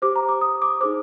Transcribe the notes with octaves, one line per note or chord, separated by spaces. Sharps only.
G4 C5 D6
A#5
D6
D#6
D6
D#4 G#4 C5 D6